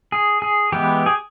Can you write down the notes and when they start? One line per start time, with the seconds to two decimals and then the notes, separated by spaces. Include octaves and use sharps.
0.12 G#4
0.42 G#4
0.72 E3 G#3 B3 G4
1.06 G#4